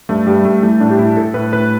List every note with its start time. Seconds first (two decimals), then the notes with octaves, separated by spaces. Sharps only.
0.09 G2 A3
0.27 G2 G3
0.45 G2 A3
0.63 E3 A3
0.80 A2 D4
0.90 G4
0.99 A2 E4
1.17 A2 A4
1.34 A2 B4
1.53 A2 B4